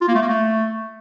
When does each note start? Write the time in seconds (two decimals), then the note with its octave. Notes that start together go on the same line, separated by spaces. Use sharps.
0.01 F4
0.08 A#3
0.15 A3
0.22 A#3
0.28 A3